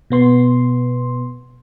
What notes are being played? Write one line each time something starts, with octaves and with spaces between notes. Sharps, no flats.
B2 B3 C6